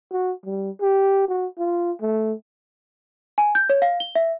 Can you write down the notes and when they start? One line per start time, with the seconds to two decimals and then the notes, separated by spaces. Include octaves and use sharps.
0.12 F#4
0.45 G3
0.81 G4
1.28 F#4
1.58 F4
2.01 A3
3.38 G#5
3.55 G6
3.70 C#5
3.82 F5
4.00 G7
4.15 E5